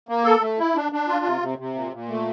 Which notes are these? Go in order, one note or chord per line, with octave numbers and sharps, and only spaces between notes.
A#3
A4
A3
E4
D4
D4
F4
C3
C3
C3
A#2
A#2
A3